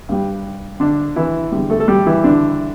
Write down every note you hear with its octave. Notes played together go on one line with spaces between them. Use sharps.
G2 G3
D3 D4
E3 E4
E2 D3 G3
A3 A4
A4
G3 G4
E3 E4
D3 D4